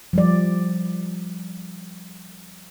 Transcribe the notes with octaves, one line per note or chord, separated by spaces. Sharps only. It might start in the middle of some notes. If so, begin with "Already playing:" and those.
F3 G3 D5